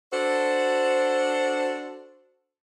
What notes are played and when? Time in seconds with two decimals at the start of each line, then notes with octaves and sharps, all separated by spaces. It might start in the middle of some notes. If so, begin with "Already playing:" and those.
0.13 D4 F#4 A4 C5